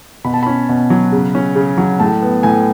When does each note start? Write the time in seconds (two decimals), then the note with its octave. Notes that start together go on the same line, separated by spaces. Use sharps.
0.24 B2 B5
0.34 A5
0.43 C#4 B5
0.69 B2
0.90 F#3
1.12 C#3
1.35 C#4
1.55 C#3
1.78 F#3
2.00 A2 A5
2.22 B3
2.43 A2 G#5